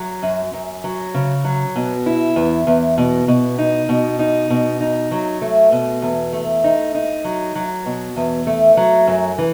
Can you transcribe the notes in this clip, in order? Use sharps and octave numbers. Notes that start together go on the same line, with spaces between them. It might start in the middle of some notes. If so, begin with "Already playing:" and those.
Already playing: F#3
F#2
F#2
F#3
C#3
F#3
B2
E4
E2
E2
B2
B2
D#4
B2
D#4
B2
D#4
F#3
A3
B2
E2
A3
D#4
D#4
F#3
F#3
B2
E2
A3
F#3
F#2
E3